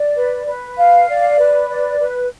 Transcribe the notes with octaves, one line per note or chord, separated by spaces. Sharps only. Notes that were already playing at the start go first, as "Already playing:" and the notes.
Already playing: D5
B4
B4
F5
D5
B4
D5
B4